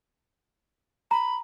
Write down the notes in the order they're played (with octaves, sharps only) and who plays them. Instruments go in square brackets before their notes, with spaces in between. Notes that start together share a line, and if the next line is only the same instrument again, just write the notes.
[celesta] A#5 [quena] B5